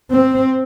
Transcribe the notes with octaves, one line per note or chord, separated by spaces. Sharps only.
C4